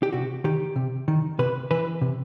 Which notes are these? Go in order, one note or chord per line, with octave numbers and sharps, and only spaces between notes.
G4
C3 F#4
D#3 G4
C3
D#3
C3 B4
E3 B4
C3